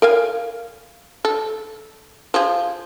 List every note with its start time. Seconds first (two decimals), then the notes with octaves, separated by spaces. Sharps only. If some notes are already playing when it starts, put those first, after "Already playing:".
0.02 A#4 F5 G#5
1.25 A4
2.34 F3 G#4